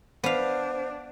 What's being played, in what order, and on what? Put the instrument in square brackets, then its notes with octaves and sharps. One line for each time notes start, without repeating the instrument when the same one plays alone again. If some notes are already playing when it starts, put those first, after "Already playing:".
[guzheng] B3 F5 [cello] D4 [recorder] C5